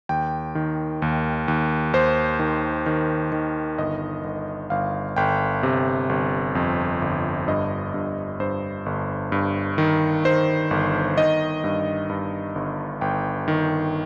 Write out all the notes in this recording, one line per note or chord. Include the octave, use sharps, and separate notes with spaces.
D#2 G5
D#3
D#2
D#2
D#2 C5
D#3
D#3
D#3
G1 D#5
G1
G1 F5
G1 G5
C3
G1
F2
G1
G2 D#5
G2
G2 C5
G1
G2
D#3
D#3 C5
G1
D#3 D#5
G2
G2
G1
G1 G5
D#3